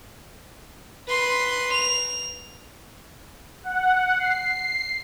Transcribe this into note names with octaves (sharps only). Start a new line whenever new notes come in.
B4 C6
F7
F#5
C7